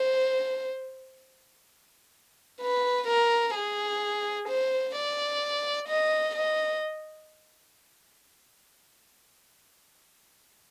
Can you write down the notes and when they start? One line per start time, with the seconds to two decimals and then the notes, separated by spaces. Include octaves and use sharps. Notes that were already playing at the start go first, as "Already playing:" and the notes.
Already playing: C5
2.61 B4
3.08 A#4
3.54 G#4
4.49 C5
4.95 D5
5.88 D#5
6.35 D#5